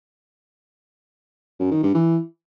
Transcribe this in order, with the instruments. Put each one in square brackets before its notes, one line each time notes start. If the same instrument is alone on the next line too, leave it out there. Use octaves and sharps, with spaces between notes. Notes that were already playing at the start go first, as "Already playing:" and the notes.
[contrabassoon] F#2
D#3
G2
E3